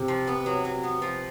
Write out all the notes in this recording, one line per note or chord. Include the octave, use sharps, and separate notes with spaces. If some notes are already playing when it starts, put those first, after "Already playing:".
Already playing: C3
F3
B3
F#3
F#3
B3
F3